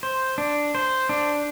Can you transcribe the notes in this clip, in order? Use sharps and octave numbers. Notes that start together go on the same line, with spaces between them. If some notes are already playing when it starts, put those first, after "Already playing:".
C5
D4
C5
D4